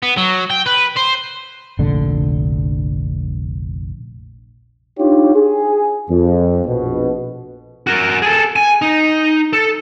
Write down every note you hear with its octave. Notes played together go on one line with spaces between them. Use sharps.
B3
F#3
G5
B4
C5
F1 A#1 D3
D4 D#4 F4 G4 C#5
G#4
F2
A#1 B2
F#4 A#4
G#4 A4
G#5
D#4
A4